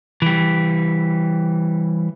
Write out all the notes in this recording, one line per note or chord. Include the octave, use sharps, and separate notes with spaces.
E3 G3